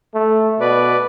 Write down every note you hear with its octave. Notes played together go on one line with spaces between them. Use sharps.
A3
B2 B4 D5